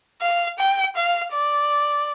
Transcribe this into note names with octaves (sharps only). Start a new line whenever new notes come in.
F5
G5
F5
D5